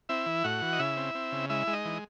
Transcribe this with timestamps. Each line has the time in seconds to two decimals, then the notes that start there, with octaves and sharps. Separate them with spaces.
0.09 C4 E4 E5
0.26 E3
0.44 A2 F#4 F#5
0.62 E3
0.73 D#5
0.79 C#3 E4 E5
0.97 C4
1.15 C4
1.32 C#3
1.50 G#3 E4 E5
1.67 G#3
1.73 D#4 D#5
1.85 E3